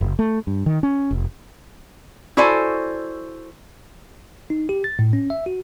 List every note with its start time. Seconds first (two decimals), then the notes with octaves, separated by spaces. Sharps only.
0.01 F#1
0.19 A3
0.47 G2
0.66 D#3
0.83 C#4
1.11 F1
2.37 E4 F#4 A4 C5 D5 G#5
4.50 D#4
4.69 G4
4.84 A6
4.99 A2
5.13 C#4
5.30 E5
5.46 F#4